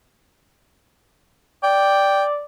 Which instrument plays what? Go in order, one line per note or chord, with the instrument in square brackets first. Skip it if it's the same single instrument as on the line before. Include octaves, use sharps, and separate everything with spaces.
[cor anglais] D5 [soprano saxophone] G5